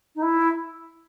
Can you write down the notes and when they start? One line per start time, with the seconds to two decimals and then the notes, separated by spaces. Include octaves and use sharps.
0.15 D#4
0.22 E4